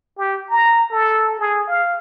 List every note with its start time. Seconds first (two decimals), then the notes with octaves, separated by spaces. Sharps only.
0.18 G4
0.49 A#5
0.91 A4
1.39 G#4
1.68 F5